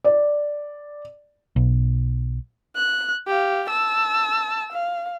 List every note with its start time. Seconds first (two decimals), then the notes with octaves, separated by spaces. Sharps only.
0.04 D5
1.56 B1
2.76 F#6
3.27 G4 F5
3.69 A5 E6
4.72 F5